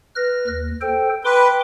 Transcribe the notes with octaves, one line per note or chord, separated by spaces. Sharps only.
B4 F6 A#6
D#2
A4 C5 G5
B4 G5 C6 D6